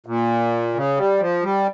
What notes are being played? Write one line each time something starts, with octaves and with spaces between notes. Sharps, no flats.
A#2
C#3
G3
F3
G3